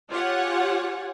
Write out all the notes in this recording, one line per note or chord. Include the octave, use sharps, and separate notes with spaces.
F4 G4 C#5 F#5 G#5